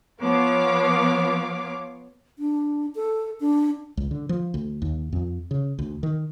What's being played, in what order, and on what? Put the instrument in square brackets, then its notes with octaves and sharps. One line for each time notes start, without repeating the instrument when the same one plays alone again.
[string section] F3 B3 C#5 F5 D6
[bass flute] D4
A4
D4
[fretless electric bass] C#2
D3
F3
D2
D#2
F2
C#3
D2
D#3